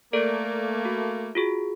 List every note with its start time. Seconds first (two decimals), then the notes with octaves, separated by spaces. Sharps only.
0.13 A3 A#3 A4 D5 D7
0.85 F#4
1.35 F4 F#4 G#4